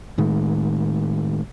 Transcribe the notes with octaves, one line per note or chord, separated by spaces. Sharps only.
A2 D#3 G#3